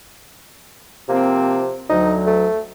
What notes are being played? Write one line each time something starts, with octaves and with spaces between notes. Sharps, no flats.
C3 F3 A#3 C4
D2 F#3 D#4
A3